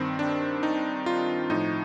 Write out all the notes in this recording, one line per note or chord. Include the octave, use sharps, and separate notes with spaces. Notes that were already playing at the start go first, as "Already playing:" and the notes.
Already playing: G2 D#3 C4
D4
D#4
F4
A2 F3 D#4